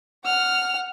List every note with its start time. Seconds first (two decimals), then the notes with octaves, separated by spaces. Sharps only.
0.25 F#5 F6